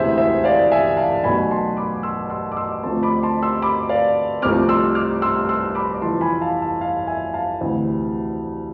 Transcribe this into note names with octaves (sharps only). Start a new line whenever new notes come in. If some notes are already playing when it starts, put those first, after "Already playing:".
Already playing: E1 D2 C3 E3 G#4 C5 E5
C5 E5
D5 F5
E5 G#5
F5 A5
B1 B2 A3 G#5 B5
A5 C6
B5 D6
C6 E6
C6 E6
D6
C6 E6
D2 D3 F3 A3 C4 A5 C6
B5 D6
A5 C6
C6 E6
B5 D6
D5 F5
C2 C3 F3 A3 C4 D6 F6
C6 E6
D6 F6
C6 E6
C6 E6
B5 D6
F1 F2 E3 A5 C6
G#5 B5
F5 A5
F5 A5
F5 A5
E5 G#5
F5 A5
D2 C3 E3